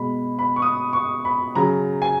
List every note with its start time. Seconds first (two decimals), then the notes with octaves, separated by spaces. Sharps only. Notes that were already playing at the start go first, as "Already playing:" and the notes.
Already playing: B2 G#3 B5
0.39 B5
0.56 C#6
0.62 D#6
0.93 C#6
1.25 B5
1.55 C#3 F#3 A#5
2.02 G#5